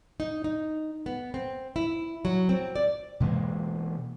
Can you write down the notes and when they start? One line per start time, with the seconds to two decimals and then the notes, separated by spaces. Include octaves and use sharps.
0.20 D#4
0.44 D#4
1.06 B3
1.34 C4
1.76 E4
2.25 F#3
2.49 C4
2.76 D5
3.20 B2 E3 G#3 A#3